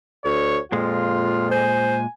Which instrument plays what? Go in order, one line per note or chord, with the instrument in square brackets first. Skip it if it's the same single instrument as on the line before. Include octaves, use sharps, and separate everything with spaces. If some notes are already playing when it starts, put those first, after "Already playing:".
[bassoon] D2 [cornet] C#5
[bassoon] F2 [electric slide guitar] A#2 G#3 [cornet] F4
[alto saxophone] C5 [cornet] G#5